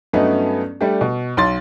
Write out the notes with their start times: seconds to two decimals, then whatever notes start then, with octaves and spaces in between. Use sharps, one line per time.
0.13 G2 F#3 A3 B3 C#4 D#4
0.81 G3 A3 D4 G4
1.01 B2
1.37 B1 C6 A6